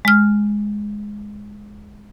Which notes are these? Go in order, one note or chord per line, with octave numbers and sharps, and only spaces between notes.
G#3 F6